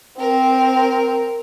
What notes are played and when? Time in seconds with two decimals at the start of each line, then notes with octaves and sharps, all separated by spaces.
0.19 C4 A#4